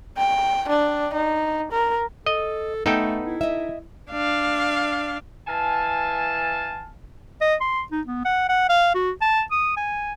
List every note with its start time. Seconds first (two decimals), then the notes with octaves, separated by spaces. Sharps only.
0.18 G5
0.68 D4
1.13 D#4
1.72 A#4
2.26 A4 D#5
2.86 A3 B3 D#4 A4 G5
3.26 E4
3.41 D#5 E5
4.11 D4 F5
5.48 E3 F5 G#5 A5
7.41 D#5
7.61 C6
7.92 D#4
8.07 B3
8.25 F#5
8.49 F#5
8.69 F5
8.95 F#4
9.21 A5
9.51 D#6
9.77 G#5